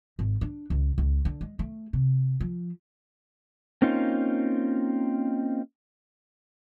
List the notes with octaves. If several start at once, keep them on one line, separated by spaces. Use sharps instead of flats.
G#1
D4
C#2
C#2
D3
G#3
A3
C3
F3
A#3 C4 C#4 D#4 F4